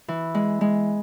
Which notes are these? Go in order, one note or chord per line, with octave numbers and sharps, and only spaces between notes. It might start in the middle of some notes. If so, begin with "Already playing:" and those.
E3
G#3
G#3